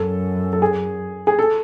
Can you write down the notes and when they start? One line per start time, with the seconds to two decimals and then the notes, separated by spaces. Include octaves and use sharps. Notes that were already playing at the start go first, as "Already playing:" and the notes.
Already playing: F#2 A4
0.53 A4
0.62 G#4
1.27 G#4
1.39 A4